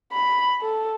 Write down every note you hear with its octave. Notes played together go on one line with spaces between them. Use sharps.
B5
A4